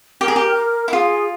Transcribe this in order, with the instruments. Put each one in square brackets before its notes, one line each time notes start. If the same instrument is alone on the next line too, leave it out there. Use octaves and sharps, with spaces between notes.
[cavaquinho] G4 [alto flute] A#4
[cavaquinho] G#4
G4
E4
[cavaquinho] F4 [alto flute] G#4